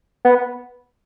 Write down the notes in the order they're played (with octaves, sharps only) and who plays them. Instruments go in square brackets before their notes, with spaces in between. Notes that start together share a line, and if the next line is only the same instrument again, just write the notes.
[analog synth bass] B3